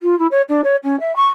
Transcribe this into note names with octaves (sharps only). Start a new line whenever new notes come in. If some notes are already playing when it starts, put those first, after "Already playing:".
F4
E4
C#5
D4
C#5
C#4
E5
C#6